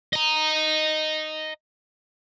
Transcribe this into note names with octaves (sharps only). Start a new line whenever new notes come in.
D#5 A#5